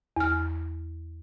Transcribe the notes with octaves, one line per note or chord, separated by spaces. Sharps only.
E2 F6